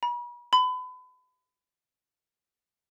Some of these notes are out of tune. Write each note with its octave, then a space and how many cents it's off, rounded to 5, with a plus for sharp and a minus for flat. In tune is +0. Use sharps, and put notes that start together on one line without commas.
B5 -40
B5 +35